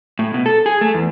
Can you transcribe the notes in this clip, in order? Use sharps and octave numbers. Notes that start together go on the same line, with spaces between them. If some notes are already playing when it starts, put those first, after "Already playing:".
A2
B2
A4
G#4
A3
E2